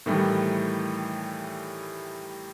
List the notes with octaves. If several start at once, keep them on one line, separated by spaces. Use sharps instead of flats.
A2 D#3 E3 G3 A3